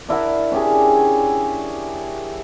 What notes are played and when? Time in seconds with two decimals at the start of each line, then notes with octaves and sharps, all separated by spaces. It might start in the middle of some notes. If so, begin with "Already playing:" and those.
0.09 D4 E4 A#4 F#5
0.51 C#4 D4 G4 G#4